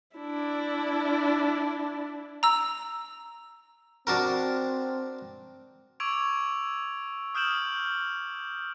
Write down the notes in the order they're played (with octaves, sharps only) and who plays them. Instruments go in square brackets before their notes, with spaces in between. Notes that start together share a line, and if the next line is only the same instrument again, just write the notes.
[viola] D4 E4
[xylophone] A#5 E6
[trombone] C4 [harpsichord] D4 F#4 A#4
[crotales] C#6 D6 E6 G#6 D7 F7
D#6 F6 G6 D7 E7 F#7